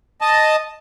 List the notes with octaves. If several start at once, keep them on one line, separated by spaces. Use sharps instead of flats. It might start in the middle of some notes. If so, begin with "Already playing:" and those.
D#5 A5